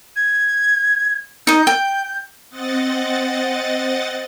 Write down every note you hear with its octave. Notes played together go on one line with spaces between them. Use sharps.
G#6
D#4 D#5 G6
G5
C4 D#5 F#5 A6